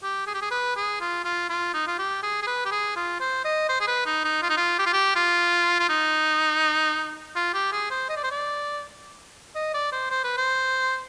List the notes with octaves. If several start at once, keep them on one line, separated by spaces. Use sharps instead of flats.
G4
G#4
G4
G#4
B4
G#4
F4
F4
F4
D#4
F4
G4
G#4
G#4
B4
G4
G#4
F4
C5
D#5
C5
G#4
B4
D#4
D#4
F4
D#4
F4
G4
F4
G4
F4
F4
D#4
F4
G4
G#4
C5
D#5
D5
C5
D5
D#5
D5
C5
C5
B4
C5